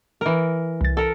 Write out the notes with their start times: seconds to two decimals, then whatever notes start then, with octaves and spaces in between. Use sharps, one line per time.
0.21 E3 A#4
0.81 C2 A6
0.97 A4 A#4